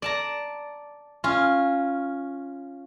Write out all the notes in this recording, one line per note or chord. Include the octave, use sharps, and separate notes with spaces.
D5 A5 A#5
C#4 F4